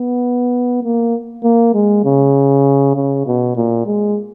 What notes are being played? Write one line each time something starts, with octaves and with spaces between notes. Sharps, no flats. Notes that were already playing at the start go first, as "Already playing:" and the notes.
Already playing: B3
A#3
A#3
G#3
C#3
C#3
B2
A#2
G#3